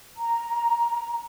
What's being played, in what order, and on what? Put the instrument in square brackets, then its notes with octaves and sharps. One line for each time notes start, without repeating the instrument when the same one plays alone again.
[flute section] A#5